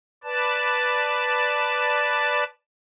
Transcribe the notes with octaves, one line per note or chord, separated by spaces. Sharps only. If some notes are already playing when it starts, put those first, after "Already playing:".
B4 D5 A5